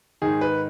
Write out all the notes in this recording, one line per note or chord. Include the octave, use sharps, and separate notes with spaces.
G#2 D#3 G#4
B4